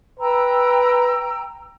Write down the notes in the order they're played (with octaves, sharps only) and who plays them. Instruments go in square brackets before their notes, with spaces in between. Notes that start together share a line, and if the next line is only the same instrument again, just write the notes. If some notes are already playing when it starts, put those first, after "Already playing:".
[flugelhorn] B4 [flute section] G5 A#5 E6